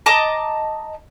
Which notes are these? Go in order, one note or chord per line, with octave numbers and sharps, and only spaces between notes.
D#5 A5 A#5 D6